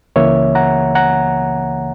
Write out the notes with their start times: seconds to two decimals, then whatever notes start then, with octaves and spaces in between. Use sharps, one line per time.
0.16 C#2 C#3 E3 A#3 C#5 E5
0.55 F#5 A#5
0.95 F#5 A#5